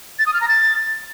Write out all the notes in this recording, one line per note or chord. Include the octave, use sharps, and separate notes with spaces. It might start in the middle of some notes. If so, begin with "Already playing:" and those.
A6
D#6
F6
A#5
A6